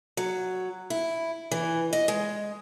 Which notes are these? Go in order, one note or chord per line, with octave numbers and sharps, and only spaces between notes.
F#3
E4
E3
D#5
G#3